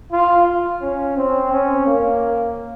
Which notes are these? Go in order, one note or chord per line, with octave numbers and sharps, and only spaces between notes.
F4
C#4
C4
C#4
A#3